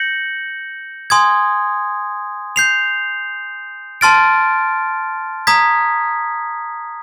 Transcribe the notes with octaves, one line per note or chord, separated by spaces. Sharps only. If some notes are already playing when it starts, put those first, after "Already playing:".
Already playing: G6 A#6 C#7 F#7
G#5 C6 D#6 G#6
G6 C7 F7
A5 C6 F6 A6 D7
A#5 D#6 G#6 B6